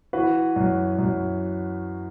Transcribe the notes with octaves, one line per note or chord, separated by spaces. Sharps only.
E3 F#4 B4
F#2
F#2